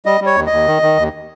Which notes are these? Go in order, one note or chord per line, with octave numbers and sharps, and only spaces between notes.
G3 D#5
G3
C#5
D#2
D#5
D#2
D#3
D#3
D#2